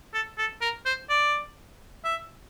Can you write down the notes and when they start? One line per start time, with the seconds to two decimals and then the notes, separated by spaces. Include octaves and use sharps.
0.14 A4
0.38 A4
0.61 A#4
0.86 C5
1.10 D5
2.05 E5